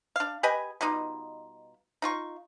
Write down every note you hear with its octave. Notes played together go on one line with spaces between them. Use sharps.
D4 F5
G4 B4 D#5 G#5
B2 G3 D#4 F4
D#4 F4 C#6